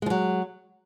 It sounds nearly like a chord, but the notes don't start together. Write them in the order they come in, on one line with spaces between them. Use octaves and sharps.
G#3 F3 F#3